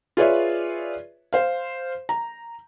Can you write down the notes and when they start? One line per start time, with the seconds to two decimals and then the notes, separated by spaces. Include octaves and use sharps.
0.17 F4 G#4 B4 C#5 D5 E5
1.33 C5 F5
2.09 A#5